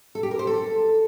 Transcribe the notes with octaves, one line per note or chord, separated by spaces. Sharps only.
A4
G4
A#4
C5
A4